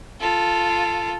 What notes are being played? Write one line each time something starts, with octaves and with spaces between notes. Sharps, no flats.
F4 A4